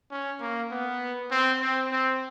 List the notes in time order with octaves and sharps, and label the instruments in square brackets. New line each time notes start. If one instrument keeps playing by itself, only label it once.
[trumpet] C#4
A#3
B3
C4
C4
C4